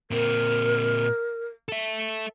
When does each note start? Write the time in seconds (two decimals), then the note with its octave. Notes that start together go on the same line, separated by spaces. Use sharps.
0.11 A#2 C4 A#4
1.69 A4 E5